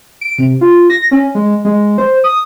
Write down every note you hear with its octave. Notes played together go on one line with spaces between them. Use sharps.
D7
C3
F4
A#6
C#4
G#3
G#3
C5
D#6